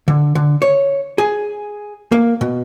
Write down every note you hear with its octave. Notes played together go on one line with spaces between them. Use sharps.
D3
D3
C#5
G#4
A#3
B2